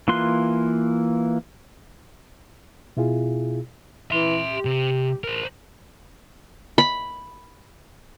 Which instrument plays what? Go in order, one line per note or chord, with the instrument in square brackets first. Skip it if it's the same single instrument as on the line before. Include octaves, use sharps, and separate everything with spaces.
[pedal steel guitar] E3 A#3 F4 C6 F#6
[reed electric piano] B2 E4 F4 G#4
[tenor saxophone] E3 [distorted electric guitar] E5 C6
[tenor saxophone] G4
[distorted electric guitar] C3
A#4 C5
[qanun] B5